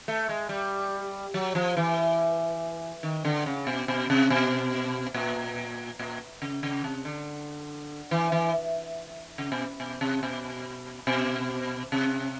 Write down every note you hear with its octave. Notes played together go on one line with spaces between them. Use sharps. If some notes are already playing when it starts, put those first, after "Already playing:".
A3
G#3
G3
F#3
F3
E3
D#3
D3
C#3
B2
B2
C3
B2
A#2
A#2
C#3
C#3
C3
D3
E3
E3
C#3
B2
B2
C3
B2
B2
C3